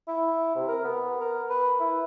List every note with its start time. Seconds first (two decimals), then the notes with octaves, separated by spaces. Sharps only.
0.08 E4
0.55 C3
0.68 A#4
0.85 B3
1.21 A#4
1.50 B4
1.80 E4